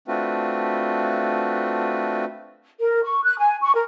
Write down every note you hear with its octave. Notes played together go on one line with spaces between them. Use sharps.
A3 C4 D4 F4 F#4 B4
A#4
C#6
F#6
G#5
C#6
A#4